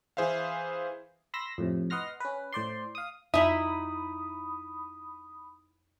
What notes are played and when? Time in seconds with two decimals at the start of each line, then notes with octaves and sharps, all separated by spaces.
0.17 E3 G#4 C5 E5 F5
1.34 B5 C6 E6 A#6
1.58 F2 A2 C3
1.90 B4 D#5 F#5 C6 F6 A#6
2.20 C#4 B4
2.53 A2 C5 D5 C6
2.95 F5 D#6
3.34 F2 D#4 E4 E5 B5 D#6